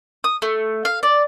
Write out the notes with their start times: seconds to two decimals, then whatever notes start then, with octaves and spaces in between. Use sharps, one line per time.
0.24 D#6
0.42 A3
0.85 F5
1.03 D5